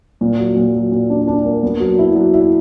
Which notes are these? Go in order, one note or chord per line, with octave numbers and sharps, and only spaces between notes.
A#2
F#3
A#2
F#3
A#2
D4
D4
A#3
B3
F#3
E4
F#3
E4